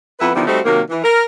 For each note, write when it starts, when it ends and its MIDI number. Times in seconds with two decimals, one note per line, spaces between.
0.19 0.33 41
0.19 0.33 59
0.19 0.33 64
0.19 0.33 71
0.35 0.47 50
0.35 0.47 51
0.35 0.47 53
0.35 0.47 55
0.35 0.47 59
0.35 0.47 64
0.47 0.59 55
0.47 0.59 57
0.47 0.59 60
0.47 0.59 63
0.47 0.59 66
0.65 0.81 48
0.65 0.81 51
0.65 0.81 54
0.65 0.81 58
0.90 1.01 52
1.04 1.23 70